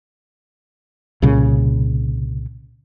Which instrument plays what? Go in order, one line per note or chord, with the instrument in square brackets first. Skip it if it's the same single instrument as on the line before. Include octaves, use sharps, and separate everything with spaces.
[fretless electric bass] C2 A#2 C#3